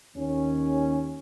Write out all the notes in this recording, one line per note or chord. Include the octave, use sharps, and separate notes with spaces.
D#2 C#4